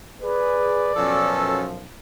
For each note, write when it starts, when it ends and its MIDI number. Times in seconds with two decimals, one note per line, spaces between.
0.22 0.91 68
0.22 0.91 71
0.22 1.47 74
0.96 1.85 35
0.96 1.85 42
0.96 1.64 47
0.96 1.85 53
0.96 1.64 61
0.96 1.64 69